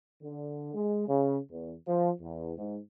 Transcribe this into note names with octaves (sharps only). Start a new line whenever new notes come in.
D3
G#3
C#3
E2
F3
E2
G#2